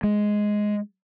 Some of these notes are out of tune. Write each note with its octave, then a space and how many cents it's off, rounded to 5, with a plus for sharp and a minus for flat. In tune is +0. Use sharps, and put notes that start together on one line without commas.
G#3 +5